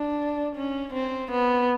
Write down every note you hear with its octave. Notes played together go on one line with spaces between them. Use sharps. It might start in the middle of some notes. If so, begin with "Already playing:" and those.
Already playing: D4
C#4
C4
B3